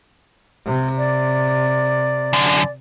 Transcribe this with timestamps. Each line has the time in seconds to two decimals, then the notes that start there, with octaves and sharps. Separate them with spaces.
0.66 C3
0.98 D5
2.33 F#2 D3